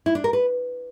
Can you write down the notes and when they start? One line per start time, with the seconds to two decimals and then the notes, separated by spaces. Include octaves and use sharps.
0.06 E4
0.15 D4
0.24 A#4
0.33 B4